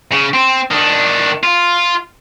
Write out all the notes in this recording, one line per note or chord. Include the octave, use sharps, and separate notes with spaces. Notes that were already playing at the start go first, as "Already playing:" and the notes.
C#3
C4
D#3 D4
F4